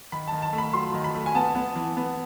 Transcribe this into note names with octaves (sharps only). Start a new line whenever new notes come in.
D#3 B5
D#3 A5
A5
A3
B5
F#3 C6
D#3
B5
A3
G#5
B3 A5
B3
E3
B3